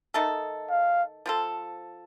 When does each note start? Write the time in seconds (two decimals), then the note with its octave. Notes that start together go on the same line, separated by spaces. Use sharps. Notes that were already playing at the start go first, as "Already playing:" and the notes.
0.14 D#3 A3 D#4 A4
0.70 F5
1.26 F3 C4 F4 A4